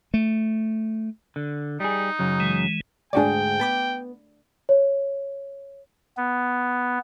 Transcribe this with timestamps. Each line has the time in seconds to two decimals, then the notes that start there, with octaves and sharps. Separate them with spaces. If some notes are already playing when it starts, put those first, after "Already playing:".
0.14 A3
1.36 D3
1.80 G3 D#4 G#4
2.19 F#2 C#3 F#3
2.40 E3 G#3
3.13 D2 G#2 D4 F#4 G#4 D5 G5
3.60 B3 A5 B5 D6
4.69 C#5
6.17 B3